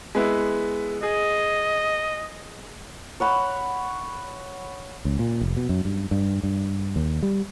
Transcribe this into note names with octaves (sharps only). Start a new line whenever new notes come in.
G#3 B3 E4
G#4 D#5
C#5 F#5 B5
C#2
A#2
F1
B2
F#2
G2
G2
G2
D#2
G3